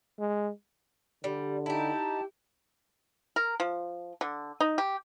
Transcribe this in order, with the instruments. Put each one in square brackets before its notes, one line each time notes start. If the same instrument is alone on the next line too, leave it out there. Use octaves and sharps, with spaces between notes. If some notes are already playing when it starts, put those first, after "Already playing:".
[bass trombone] G#3
[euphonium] D3 [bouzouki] G3
[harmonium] D#4 [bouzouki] E4 G4 [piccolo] A5
[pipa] A#4
F3
D3
D#4
G4